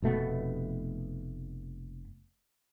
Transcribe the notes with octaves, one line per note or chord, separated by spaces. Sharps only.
F1 B2 A3 B3